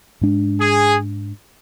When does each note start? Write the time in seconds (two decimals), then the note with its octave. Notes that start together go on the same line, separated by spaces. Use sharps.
0.21 G#2 G#3 D4
0.61 G#4